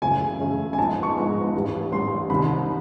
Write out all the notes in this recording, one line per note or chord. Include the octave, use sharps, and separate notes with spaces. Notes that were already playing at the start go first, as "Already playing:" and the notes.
F#2 C#3 E3 A3 C#4 G#5
F#2 C#3 E3 A3 C#4
G#5
G#2 F3 G#3 B3 D#4 A5
C#6
G#2 F3 G#3 B3 D#4
A1 G2 E3 G3
A1 G2 E3 G3 C6
C2 C3 D#3 B5